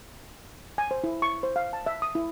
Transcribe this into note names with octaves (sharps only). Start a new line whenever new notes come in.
G#5
C5
E4
C#6
C5
F5
A5
E5
D#6
E4